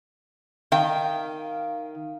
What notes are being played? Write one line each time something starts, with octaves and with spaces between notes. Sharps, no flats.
D#3 F5 G5